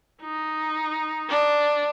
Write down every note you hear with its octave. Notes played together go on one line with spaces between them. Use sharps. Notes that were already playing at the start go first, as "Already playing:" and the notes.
D#4
D4